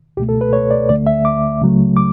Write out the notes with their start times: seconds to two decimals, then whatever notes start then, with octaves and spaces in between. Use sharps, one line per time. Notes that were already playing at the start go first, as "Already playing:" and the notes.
0.17 C#2 B2 A3 G4
0.29 A4
0.41 B4
0.53 C#5
0.71 D5
0.89 D2 D3 A3 D5
1.07 E5
1.25 D6
1.61 C#2 C#3 F#3 A3
1.97 D6